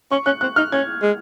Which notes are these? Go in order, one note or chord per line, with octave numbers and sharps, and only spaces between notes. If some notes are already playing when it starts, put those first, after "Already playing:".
C#4 C#6
C#4 F#6
C4 F#6
D#4 F6
C#4 G#6
G#3